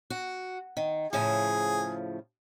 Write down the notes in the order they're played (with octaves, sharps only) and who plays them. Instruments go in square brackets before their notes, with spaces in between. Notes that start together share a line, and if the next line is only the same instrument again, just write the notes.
[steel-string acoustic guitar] F#4
D#3
[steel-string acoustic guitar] A2 C#3 F3 [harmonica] G#4